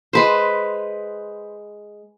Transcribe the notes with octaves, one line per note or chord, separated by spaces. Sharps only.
G#3 B4 C5